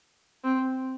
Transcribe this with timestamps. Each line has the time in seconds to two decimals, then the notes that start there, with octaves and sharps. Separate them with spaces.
0.44 C4